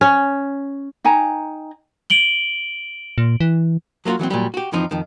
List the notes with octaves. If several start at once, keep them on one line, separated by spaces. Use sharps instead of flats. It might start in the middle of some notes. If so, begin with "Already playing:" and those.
C#4
D#4 G5 G#5 A#5
D7 F#7 G7
A#2
E3
F#3 A#3 B3 F4 F#4
E3 F#3 G3 C4
A#2 F#3 G3
F#4 G4
F2 E3 F3 C4 D#4
F2 D#3